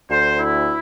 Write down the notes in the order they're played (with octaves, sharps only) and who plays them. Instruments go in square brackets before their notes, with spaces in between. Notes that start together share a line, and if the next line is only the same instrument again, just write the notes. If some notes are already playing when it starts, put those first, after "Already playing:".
[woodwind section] D2 [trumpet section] C5
[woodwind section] E4